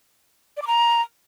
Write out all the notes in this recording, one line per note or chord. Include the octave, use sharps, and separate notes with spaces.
D5
D6
A#5